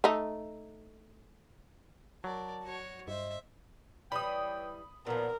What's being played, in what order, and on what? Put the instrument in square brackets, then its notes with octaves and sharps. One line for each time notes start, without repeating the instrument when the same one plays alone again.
[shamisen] A3 D#4
[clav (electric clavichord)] F#3 [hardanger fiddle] A#4 D5 [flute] A5
[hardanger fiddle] F#4 C#5
[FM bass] G2 [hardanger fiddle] C5 E5 [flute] D#5
[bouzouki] E3 G3 [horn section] B4 C#5 G5 [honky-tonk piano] B5 D#6
[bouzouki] A#2 F3 [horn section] B3 [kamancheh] A#4